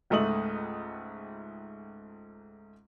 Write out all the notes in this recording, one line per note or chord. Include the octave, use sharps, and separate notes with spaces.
C#2 G#2 A3 D#5 D#6 F#7